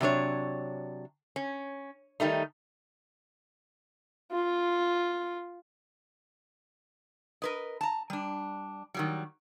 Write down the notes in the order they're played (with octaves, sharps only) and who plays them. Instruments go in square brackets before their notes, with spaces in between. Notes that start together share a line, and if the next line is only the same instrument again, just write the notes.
[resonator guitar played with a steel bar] C3 F#3 D4 C#5
C#4
D#3 G3 A3 D#4
[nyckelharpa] F4
[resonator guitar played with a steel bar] A#4 B4 D#5
A5 A#5
G3 D4
D#3 F#3 G3